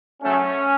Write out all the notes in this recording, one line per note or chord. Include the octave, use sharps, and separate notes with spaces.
C#3 F#3 A3 C#4